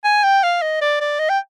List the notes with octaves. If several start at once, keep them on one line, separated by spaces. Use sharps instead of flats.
G#5
G5
F5
D#5
D5
D5
D#5
G5